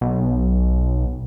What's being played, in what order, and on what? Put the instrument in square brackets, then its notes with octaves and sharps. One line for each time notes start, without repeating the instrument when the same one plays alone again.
[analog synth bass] B1